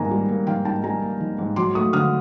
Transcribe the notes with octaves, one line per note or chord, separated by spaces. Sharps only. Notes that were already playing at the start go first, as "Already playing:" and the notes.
Already playing: G#2 D#3 G3 A#3 G#5 A#5
G3
A#3
D#3 F5 G5
G#2 G5 A5
G3 G#5 A#5
A#3
D#3
G#2
F#3 C6 D6
A3 C#6 D#6
D3 D#6 F6